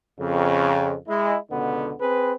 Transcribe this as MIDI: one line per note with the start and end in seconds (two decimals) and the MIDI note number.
0.19 0.95 41
0.19 0.95 49
1.08 1.37 56
1.08 1.37 64
1.51 1.94 37
1.51 1.94 47
1.51 1.94 50
1.51 1.94 59
2.00 2.32 60
2.00 2.32 68
2.00 2.32 71